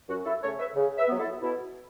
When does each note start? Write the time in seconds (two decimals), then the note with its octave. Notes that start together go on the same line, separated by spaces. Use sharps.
0.09 F#2 F#4
0.25 E4 A4
0.42 C#3 A3 C#4 A4 C#5
0.59 B4 E5
0.75 C#3
0.98 B4 E5
1.09 F#3 B3
1.19 E4 A4
1.42 B2 E4